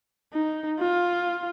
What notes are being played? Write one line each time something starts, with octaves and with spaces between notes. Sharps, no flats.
D#4
F4